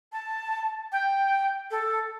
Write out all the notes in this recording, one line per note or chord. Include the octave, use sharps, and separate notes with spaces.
A5
G5
A4